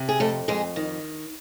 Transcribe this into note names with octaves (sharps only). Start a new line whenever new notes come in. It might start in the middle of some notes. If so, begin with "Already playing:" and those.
Already playing: C3
G#4
F2 A3 A4
F2 G#3 G#4
D#3